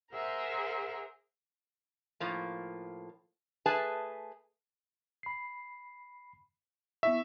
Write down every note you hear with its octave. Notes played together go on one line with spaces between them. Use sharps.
G#4 A#4 C5 E5 F#5 A#5
A2 F3 A#3
A3 G#4 B4 G#5 A5
B5 C7
B3 E4 E5 C#6